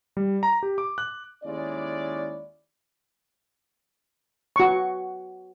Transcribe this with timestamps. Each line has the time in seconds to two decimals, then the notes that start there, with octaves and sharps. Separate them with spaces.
0.17 G3
0.43 A#5
0.63 G4
0.78 D6
0.98 F#6
1.44 D#2 G#3 C#4 E4 D5
4.56 F#4 C#6